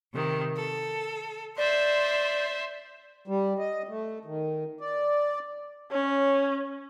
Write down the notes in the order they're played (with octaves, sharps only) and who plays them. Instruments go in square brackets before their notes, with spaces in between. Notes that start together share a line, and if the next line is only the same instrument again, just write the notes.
[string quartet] C3 D#3
A4
[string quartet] C5 E5 C6 [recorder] D5
[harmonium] G3
D#5
A3
D#3
D5
[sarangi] C#4 [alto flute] C#5